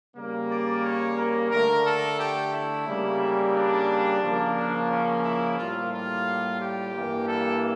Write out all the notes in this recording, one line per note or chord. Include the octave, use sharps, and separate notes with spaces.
C#3 G3 A#3
D5
C#5
A#4
D3 A3 A#4
A4
G4
E4
C#3 G3 A#3
D4
C#3 F3 A#3
D4
C#4
E4
A2 G3 A#3 F4
F4
G4
G2 E3 A#3
A4